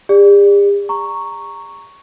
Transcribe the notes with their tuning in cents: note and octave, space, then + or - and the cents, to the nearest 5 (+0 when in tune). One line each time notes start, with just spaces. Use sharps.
G4 +45 D5 +10
A#5 -10 C#6 +0